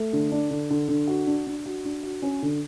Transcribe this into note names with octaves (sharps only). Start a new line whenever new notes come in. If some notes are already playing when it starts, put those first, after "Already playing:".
Already playing: A3
D3
D4
D3
D3
D3
F#4
D4
D4
F#4
D4
F#4
C#4
D3